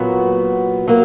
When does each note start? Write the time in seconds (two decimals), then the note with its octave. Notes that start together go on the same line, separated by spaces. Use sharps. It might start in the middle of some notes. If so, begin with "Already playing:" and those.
Already playing: A#2 F#3 B3 F#4
0.88 F#3 A#3